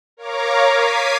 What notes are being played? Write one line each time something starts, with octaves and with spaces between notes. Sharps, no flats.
A#4 C#5 F5 A#5 D6
D6 G#6 B6 C7 D#7